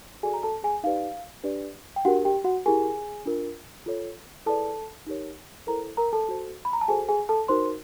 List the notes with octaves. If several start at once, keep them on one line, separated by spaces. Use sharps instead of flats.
F#4 G#4 A4 D5 G#5
A#5
A4 A5
G#4 G#5
D#4 G4 B4 D5 F5
D4 G4 B4 D5
G5
D4 F#4 G4 A#4 F#5
G4 G5
F#4 F#5
E4 G4 G#4 A#4 G#5
D4 F4 A#4
F4 A4 C#5
E4 G#4 A4 B4 D5 A5
D#4 G4 A#4 C#5
E4 A4 A#4 C5 A#5
A#4 A#5
A4 A5
F#4 A4 C5
B5
A#5
A5
F#4 G#4 A4 C5 G#5
G#4 G#5
A4 A5
D#4 F#4 A#4 C5 C6